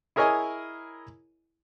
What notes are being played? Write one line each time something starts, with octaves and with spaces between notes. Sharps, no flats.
E4 G#4 A#4 C#5 D#5 G#5